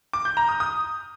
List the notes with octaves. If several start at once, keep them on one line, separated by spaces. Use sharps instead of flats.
D6
G6
A#5
D#6
D#6